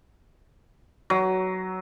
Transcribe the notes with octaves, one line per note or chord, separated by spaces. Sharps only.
F#3